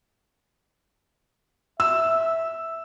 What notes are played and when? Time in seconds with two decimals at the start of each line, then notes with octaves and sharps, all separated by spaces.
1.80 E5 E6